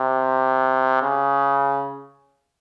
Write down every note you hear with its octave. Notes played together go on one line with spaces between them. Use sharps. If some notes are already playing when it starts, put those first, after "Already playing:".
Already playing: C3
C#3